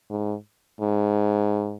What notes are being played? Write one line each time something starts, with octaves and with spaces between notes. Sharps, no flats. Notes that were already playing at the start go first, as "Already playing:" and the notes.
G#2
G#2